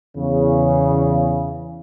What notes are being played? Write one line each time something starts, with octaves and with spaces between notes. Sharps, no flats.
E2 C#3